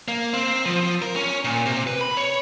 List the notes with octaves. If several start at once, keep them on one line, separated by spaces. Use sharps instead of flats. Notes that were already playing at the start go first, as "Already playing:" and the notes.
A#3
C4
F3
A#4
C#4
A#2
C3
B4
B5
C#5